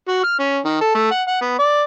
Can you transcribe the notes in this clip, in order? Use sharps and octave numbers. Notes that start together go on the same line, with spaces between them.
F#4
F6
C#4
D#3
A4
A3
F#5
F#5
B3
D5